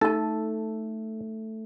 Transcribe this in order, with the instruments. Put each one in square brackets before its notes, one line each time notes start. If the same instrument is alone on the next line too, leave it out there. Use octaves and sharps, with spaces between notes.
[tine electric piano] A3 [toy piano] D#4 A5 [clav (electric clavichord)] A4